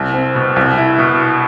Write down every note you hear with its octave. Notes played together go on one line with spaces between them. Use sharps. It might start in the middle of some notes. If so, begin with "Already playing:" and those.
Already playing: C2
C4
B2
C2
E4
B2